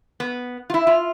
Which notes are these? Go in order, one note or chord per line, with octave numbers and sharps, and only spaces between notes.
B3
F4
E4
F4